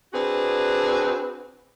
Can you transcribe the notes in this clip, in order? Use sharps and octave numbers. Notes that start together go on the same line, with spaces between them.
C4 D4 F#4 G#4 B4